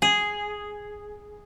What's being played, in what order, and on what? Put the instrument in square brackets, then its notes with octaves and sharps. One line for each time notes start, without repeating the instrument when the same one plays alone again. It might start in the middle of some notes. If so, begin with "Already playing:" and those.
[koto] G#4